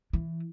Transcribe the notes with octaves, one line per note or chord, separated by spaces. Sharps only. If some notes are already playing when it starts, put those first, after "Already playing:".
E3